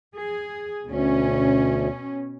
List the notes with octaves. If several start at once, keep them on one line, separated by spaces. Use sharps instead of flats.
G#4
D2 B2 C#4